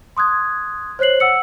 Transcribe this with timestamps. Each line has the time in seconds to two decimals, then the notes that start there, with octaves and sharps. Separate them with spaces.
0.17 C6 D#6 F#6 G#6
0.99 C5 C#5 F#6 C7 F#7
1.20 F#5 E6 C#7